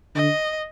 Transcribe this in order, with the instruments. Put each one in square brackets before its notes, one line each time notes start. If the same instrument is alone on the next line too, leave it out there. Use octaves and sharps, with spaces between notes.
[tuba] D3 [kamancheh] D#5